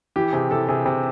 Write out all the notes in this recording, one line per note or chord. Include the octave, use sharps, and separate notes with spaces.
E3 G4
C3 G#4
E3 A4
C3 G#4
C3